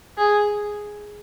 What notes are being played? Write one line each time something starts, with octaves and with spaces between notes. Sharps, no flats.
G#4